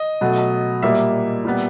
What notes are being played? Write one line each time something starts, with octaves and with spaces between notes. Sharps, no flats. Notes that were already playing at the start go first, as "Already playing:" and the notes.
Already playing: D#5
B2 F#3 A3
A#2 G3 A#3 E5
A#2 G3 B3